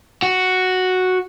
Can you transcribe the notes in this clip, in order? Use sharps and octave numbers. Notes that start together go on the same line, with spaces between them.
F#4